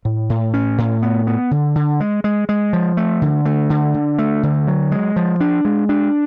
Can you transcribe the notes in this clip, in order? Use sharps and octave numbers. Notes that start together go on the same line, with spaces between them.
A2
A2
C#4
A2
B3
B3
D3
D3
G#3
G#3
G#3
F3
A3
D3
A3
D3
D3
A3
D3
F#3
G#3
F3
D4
G#3
D4